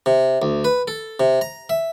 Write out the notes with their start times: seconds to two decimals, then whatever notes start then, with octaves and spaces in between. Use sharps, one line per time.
0.06 C3
0.42 D2
0.65 B4
0.88 A4
1.20 C3
1.41 A#5
1.69 E5